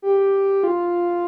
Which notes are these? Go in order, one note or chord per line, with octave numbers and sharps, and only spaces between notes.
G4
F4